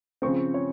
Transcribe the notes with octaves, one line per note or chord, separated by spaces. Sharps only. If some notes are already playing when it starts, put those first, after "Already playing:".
C#3 F3 C4 C#6
C#5